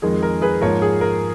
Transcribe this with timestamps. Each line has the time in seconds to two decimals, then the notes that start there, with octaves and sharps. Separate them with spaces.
0.02 F2 D#3 G#3 G#4
0.23 A#4
0.42 G#4 B4
0.61 G#2 F3 A#3 A#4 C#5
0.82 G#4
1.01 A#4